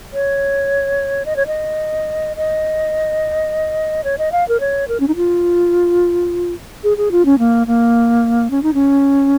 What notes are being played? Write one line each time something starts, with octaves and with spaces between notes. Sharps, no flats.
C#5
D#5
C#5
D#5
D#5
C#5
D#5
F5
A#4
C#5
A#4
C#4
D#4
F4
G#4
G#4
F4
C#4
A#3
A#3
C#4
D#4
C#4